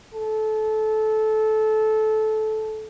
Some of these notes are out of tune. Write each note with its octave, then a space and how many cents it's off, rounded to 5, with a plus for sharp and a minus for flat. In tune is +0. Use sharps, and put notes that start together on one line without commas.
A4 -20